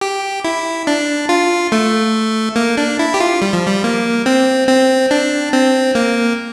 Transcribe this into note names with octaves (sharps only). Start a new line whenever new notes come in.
G4
E4
D4
F4
A3
A#3
D4
E4
G4
F4
G3
F3
G3
A#3
C4
C4
D4
C4
A#3